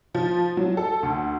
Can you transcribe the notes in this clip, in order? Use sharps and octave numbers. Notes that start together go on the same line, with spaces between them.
F3
F#3
A4
D2